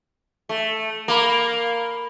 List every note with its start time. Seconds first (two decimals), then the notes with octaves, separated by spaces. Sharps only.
0.49 A3
1.08 A#3 A#5 B5